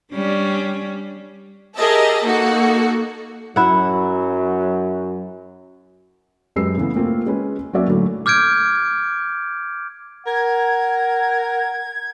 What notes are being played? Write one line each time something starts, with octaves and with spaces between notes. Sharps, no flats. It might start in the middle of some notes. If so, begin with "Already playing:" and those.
G3 C#4 D4
G4 G#4 A#4 D#5 E5 A5
A#3 D#4 F#4 A4
F#2 F#3 E4 F#5
F#2 G#3 G4 B4 E6 C7
C#3 E3 A3 B3
A3 A#3 C4 F4 A4
G#3 C#4 B4
F#3 A#3 C#4 F#4 D5 E5
A2 D3 F#3 A3 E4
D6 F6 G6 G#6 D7
A#4 F#5 G#6